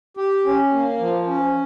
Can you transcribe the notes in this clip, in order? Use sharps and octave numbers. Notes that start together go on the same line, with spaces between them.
G4
C#4
A#3
F3
C#4